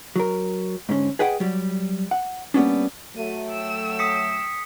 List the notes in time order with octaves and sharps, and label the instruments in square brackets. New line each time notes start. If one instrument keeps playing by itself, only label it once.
[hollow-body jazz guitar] F#3 A#4
G#2 D3 C#4
G#4 B4 D#5 F#5 G5
F#3 G3
F#5
G3 A#3 B3 C#4 D4
[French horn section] F#3 A3 [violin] D#7
[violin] G5 E6
[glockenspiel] D#6 B6 C#7